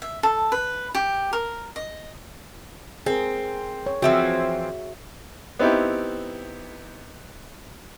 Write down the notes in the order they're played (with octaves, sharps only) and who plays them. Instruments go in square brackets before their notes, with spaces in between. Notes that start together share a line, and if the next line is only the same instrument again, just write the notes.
[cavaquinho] E5
A4
B4
G4
A#4
D#5
[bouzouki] C4 [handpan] G#4 A#4
[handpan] C#5
[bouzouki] E3 F3 C4 [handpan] F#4 G#4 E5
[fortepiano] B3 C4 D#4 E4 G4